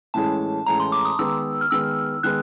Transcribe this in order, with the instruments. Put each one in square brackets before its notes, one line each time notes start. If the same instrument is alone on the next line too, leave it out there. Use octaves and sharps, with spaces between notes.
[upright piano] A2 E3 G#3 C#4 [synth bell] A5
[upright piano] A2 E3 G#3 C#4 [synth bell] A#5
[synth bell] C6
D6
D#6
[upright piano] D#3 G#3 B3 [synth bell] E6
[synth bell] F6
[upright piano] D#3 G#3 B3 [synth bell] E6
[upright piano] D#3 G#3 B3 [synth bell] F#6